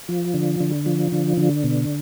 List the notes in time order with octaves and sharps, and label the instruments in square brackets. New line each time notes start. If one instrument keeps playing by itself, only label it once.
[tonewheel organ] F3
D3
D3
F3
D3
D3
B2